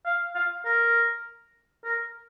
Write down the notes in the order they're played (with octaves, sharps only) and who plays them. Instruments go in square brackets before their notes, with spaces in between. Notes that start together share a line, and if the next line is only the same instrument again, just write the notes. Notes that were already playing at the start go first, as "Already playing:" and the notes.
[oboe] F5
F5
A#4
A#4